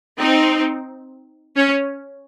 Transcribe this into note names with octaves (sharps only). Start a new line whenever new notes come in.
C4 D#4
C#4